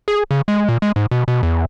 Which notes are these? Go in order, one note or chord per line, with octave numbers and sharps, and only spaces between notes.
G#4
C#3
G#3
A#2
G#3
G#2
B2
B2
E2